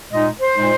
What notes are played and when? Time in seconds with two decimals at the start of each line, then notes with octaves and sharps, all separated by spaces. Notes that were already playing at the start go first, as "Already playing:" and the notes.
0.12 A#2 G#3 D#4 D#5
0.41 C5
0.56 A#2 G#3 D#4